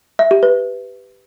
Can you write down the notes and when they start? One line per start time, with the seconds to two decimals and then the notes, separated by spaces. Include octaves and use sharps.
0.19 E5
0.31 G4
0.43 B4